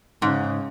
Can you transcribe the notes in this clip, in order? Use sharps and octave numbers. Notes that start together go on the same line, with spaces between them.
G#2 C#3